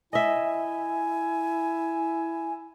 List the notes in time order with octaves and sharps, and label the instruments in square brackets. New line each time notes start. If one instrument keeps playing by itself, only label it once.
[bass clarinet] E4 [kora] D#5 E5 [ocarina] G#5